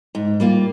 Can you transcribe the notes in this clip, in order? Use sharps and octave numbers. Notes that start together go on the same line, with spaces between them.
G#2
G3 A#3 F4